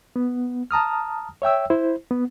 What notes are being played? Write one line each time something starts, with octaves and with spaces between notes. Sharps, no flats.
B3
A5 A#5 D#6 F6
C#5 E5 G5 E6
E4 C5
B3